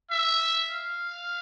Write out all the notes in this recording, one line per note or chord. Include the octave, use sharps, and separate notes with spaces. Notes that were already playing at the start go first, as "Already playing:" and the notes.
E5
F5